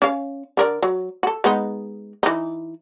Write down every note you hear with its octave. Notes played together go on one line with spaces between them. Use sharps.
C#4 F5
D3 A#4 D5
F#3
F#4 A4
G#3 B3 D#4
E3 D#4